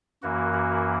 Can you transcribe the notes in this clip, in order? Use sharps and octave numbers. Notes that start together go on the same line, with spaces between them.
F#2 E3 A#3 F#4
F#4